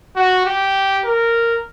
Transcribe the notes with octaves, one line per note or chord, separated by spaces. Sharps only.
F#4
G4
A#4